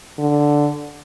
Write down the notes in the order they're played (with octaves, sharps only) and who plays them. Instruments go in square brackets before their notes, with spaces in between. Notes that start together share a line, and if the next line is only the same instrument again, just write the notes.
[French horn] D3